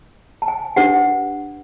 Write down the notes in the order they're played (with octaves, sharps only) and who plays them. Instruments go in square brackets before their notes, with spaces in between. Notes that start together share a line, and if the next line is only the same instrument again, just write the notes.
[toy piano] A5
G#5
D4 G4 B4 F#5